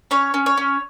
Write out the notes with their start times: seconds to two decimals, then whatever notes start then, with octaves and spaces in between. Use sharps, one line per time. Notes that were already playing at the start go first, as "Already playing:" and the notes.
0.11 C#4 C#5
0.34 C#4
0.46 C#5
0.57 C#4